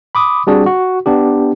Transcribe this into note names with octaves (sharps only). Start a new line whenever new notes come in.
B5 D6 D#6
G3 C4 D4 F#4 G#4 D5
F#4
B3 D4 G4